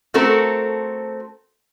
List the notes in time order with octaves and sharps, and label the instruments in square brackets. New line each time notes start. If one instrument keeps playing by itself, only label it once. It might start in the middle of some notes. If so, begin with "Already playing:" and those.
[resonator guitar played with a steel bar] A3 C4 F#4 A4 A#4